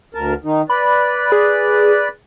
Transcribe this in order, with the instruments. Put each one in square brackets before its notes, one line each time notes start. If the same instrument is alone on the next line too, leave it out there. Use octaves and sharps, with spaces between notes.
[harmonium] D2 A#4 A5
D#3 D#4
[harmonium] B4 D5 [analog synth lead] B5
[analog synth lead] G#4